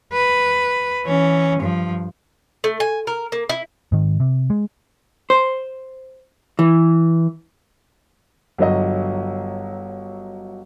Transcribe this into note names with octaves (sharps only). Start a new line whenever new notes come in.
B4
E3 C#4
G2 F3
A3
G#5
A#4
A#3
E4
G#2 D#3
C3
G#3
C5
E3
G1 F#3 D#5